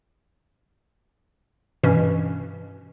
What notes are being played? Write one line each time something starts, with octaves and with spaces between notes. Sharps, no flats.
G2 B2 E3 C#4